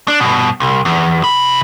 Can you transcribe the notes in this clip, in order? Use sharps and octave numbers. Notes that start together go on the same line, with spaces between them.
D4
G2 B2
C2
E2
C3 B5